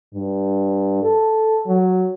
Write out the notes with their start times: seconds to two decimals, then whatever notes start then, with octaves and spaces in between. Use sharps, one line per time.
0.14 G2
1.03 A4
1.66 F#3